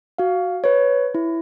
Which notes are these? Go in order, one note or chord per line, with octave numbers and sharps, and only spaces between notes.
F#4 F5
B4 C#5
E4